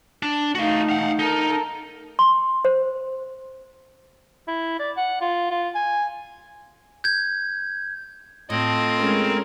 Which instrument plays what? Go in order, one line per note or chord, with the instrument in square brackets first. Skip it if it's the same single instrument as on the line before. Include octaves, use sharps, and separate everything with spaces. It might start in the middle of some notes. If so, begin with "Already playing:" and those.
[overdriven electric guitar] D4
[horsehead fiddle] A3 D#4 [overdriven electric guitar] F#4 F5
[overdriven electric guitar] F5 F#5
[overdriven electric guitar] D#4 [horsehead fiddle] A4 A#4
[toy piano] C6
C5
[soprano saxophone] E4
D5
F#5
F4
F4
G#5
[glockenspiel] G6 G#6
[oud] A2 [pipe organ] C4 [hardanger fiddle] F4 D#5
[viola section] G#3 C#4 A#4